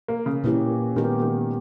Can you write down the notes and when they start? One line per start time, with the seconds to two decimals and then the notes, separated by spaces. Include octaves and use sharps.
0.08 A#3
0.26 C#3
0.44 A#2 E3 A#3 C#4 G4
0.96 A#2 D#3 G#3 B3 G4 A#4
1.22 D#3